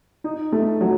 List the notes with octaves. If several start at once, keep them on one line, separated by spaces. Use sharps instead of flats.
D#4
A3
F#3